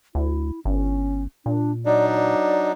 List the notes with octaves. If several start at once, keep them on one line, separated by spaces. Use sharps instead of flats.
D2 E4
G1 C#4
A#2 D4
F#3 D4 D#4 D5
D5